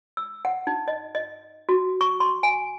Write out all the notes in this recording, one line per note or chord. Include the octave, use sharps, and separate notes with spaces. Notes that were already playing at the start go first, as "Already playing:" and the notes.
E6
F#5
D#4
D#5
D#5
F#4
C#6
C6
G#5